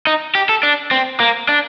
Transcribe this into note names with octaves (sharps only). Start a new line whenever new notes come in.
D#4
G4
A4
D4
C4
A#3
D4